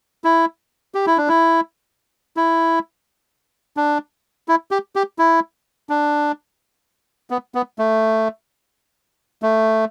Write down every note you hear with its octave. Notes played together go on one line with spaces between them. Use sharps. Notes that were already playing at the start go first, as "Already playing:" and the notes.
E4
G4
E4
D4
E4
E4
D4
E4
G4
G4
E4
D4
B3
B3
A3
A3